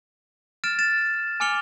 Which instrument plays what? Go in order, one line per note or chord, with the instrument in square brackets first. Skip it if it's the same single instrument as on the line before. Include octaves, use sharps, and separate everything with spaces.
[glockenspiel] F6 A6 D7 E7
A6 D7 E7
G#5 D6 F6 C#7 F7 G7